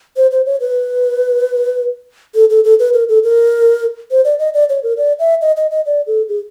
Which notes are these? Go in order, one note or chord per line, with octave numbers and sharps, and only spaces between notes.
C5
C5
C#5
B4
A4
A4
A4
B4
A#4
A4
A#4
C5
D5
D#5
D5
C#5
A#4
D5
E5
D#5
D#5
D#5
D5
A4
G#4